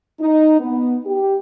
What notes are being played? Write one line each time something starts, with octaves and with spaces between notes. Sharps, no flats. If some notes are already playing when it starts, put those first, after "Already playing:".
D#4
B3
G4